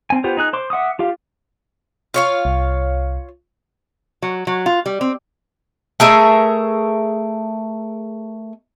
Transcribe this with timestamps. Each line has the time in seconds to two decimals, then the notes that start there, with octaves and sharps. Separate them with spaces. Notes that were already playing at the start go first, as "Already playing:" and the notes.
0.10 C4 G#5
0.24 B3 F4 G4 C5
0.37 D#4 G#4 F#6
0.53 C5 C6 D6
0.70 E5 F#5 D6 D#6
0.99 F4 G4 F5
2.14 F4 C#5 F5
2.45 C2
4.22 F#3
4.47 F#3
4.66 F4
4.86 G3
5.01 C4
6.00 A3 G#4 A#4 E5